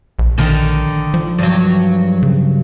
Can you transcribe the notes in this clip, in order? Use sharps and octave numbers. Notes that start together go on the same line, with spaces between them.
A#1
D3 D#3
F3
G2 F#3
C#3